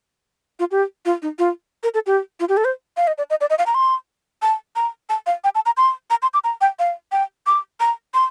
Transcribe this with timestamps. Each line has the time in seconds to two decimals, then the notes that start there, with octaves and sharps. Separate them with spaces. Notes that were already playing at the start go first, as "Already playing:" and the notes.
0.59 F4
0.71 G4
1.05 F4
1.22 D#4
1.39 F4
1.83 A#4
1.94 A4
2.06 G4
2.40 F4
2.49 G4
2.57 A4
2.65 C5
2.97 F5
3.07 D#5
3.18 D5
3.30 D#5
3.41 D5
3.50 D#5
3.58 F5
3.66 A#5
3.74 C6
4.42 A5
4.76 A#5
5.09 A5
5.26 F5
5.44 G5
5.55 A5
5.66 A#5
5.77 C6
6.10 A#5
6.22 C6
6.34 D6
6.44 A#5
6.61 G5
6.79 F5
7.12 G5
7.46 D6
7.80 A#5
8.14 C6